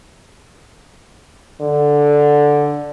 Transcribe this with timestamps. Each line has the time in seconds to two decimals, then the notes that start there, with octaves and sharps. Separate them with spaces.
1.61 D3